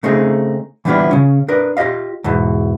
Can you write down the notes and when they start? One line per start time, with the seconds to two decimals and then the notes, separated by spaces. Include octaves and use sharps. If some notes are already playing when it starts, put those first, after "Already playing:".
0.03 C#3 A3 C4 D#4 G#4
0.85 E3 G3 B3 D4 E4 F4
1.11 C#3 C#4
1.48 D4 A#4 B4
1.77 F4 G4 B4 D#5 F5
2.24 E2 G#2 B2 E3